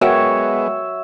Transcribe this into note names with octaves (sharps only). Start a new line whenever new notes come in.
G#3 B3 F#4 A#4 C#5 E5 F#5 G5